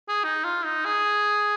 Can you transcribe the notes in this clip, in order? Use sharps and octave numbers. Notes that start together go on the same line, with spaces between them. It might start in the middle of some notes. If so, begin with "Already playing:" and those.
G#4
D#4
F4
D#4
G#4